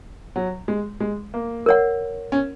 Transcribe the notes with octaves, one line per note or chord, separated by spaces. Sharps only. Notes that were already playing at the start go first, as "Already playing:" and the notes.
F#3
G#3
G#3
A#3
A#4 C#5 F#5
C#4